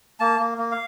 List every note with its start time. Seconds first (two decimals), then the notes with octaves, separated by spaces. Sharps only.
0.20 A#3 A5
0.39 A#3
0.58 A#3
0.72 F5